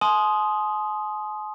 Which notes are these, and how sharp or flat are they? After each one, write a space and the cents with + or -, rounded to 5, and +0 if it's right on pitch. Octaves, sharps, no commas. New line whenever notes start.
G#5 +45 C6 +0 D#6 +0